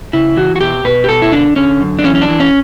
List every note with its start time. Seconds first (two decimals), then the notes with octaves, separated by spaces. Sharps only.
0.13 C#3 E4
0.36 E3 F#4
0.56 F#4
0.61 B2 G4
0.84 B2 B4
1.04 G4
1.09 B2 A4
1.22 E4
1.32 D3 D4
1.56 D3 C#4
1.80 F#2
1.99 D4
2.04 E3 C#4
2.15 C#4
2.22 D4
2.29 E3
2.40 C#4